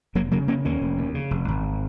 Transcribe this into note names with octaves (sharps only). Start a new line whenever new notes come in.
F1 F#3 A#3
C#3 F#3 A#3
C#3 A#3 C#4
D#2 A#3 C#4
F1
D#2
C#3
F1
G#1